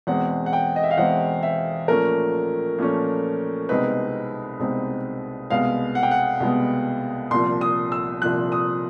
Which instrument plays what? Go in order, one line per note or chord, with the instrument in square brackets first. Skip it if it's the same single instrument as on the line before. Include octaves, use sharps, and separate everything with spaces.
[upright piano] E2 B2 G#3 C4 F#5
F#5
G5
D#5
E5
F5
E2 B2 G#3 C4 F#5
E5
A#2 F3 A3 C#4 A#4
A#2 F3 A3 C#4
C2 B2 G#3 C4 D#4 B4
C2 B2 G#3 C4 D#4
C2 B2 G#3 B3 F5
F#5
G5
F#5
C2 B2 G#3 B3
C2 A#2 F3 C6
D#6
E6
C2 A#2 F3 F#6
D#6